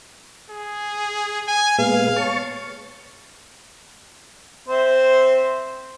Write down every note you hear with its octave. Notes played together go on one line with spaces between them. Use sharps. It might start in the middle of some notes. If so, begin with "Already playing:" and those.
G#4
G#5
A#2 G#3 B3 F5
C#5 A5 C#6
C4 C5 E5